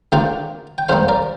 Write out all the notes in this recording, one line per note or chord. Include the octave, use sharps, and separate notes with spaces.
D2 D3 A#3 D4 F4 D5 G5
G5
F2 C3 G3 A#3 C5 F5
A#4 D5